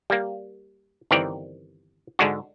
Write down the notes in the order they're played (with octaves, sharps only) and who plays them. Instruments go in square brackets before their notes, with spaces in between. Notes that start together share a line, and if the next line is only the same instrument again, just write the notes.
[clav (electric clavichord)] G3 A#3
G1 D#3 E3 C4 A#4 D5
G#2 D3 G#3 D4 F#4